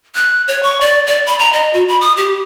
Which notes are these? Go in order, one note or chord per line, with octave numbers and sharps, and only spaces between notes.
F#6
C#5
C#6
D5
D5
B5
A#5
D#5
F#4
B5
D#6
G4